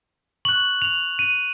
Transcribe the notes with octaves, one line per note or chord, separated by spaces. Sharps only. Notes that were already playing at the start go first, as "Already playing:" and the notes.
C#6 F#6 F#7
F7
D#7